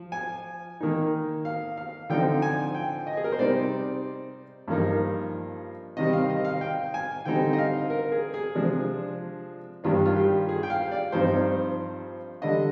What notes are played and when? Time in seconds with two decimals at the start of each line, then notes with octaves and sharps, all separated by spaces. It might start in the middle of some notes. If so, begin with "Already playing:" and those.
Already playing: F3
0.12 G#5
0.80 D#3 A#3 D#4
1.45 F5
1.77 F5
2.10 D3 F3 C4 D#4 G5
2.42 G#5
2.74 G5
3.07 D#5
3.17 G#4
3.24 A#4
3.32 C5
3.39 C3 G3 C4 D#4 D5
4.68 G2 F3 A#3 D#4
5.97 C3 D#3 G3 C4 D#5
6.13 F5
6.30 D#5
6.45 F5
6.61 G5
6.94 G#5
7.25 D3 G3 C4 D#4 G5
7.53 D#5
7.58 F5
7.90 A#4
8.12 G#4
8.34 G#4
8.55 C3 F3 G#3 D4
9.84 G2 D#3 G3 D4 F4
10.06 F4
10.16 G4
10.49 G#4
10.63 G5
10.70 F5
10.91 D5
11.12 G2 F3 C4 D#4 C5
12.42 D3 G3 D4 D#5